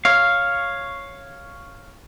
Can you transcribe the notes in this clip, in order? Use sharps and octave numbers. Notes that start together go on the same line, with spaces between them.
C#5 F5